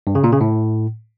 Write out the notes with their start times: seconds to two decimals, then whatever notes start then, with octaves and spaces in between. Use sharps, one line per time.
0.07 G2
0.15 C#3
0.24 A#2
0.32 C#3
0.41 A2